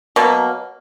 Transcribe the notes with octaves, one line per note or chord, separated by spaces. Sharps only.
B2 F#3 A#3